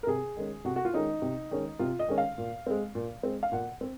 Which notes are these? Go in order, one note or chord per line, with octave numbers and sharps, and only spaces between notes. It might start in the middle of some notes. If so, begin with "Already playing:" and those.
A#4
C3 G#4
D#3 G#3 C#4
C3 F#4
F#4
F4
D#3 G#3 C#4 D#4
C3
D#3 G#3 C#4
C3 F4
D#5
D#3 G#3 C#4
F5
A#2
G#3 C4
A#2
G#3 C4
F5
A#2 F#5
C4